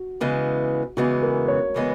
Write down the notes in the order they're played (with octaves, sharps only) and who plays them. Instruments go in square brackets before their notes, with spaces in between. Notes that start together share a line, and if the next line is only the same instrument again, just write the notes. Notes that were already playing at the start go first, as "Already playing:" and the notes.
Already playing: [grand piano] F#4
[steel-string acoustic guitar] E2 C#3 E3 G#3 B3
[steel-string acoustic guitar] E2 C#3 E3 G#3 B3 [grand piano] F#4
[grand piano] A#4
C#5
[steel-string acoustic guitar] C#3 E3 G#3 B3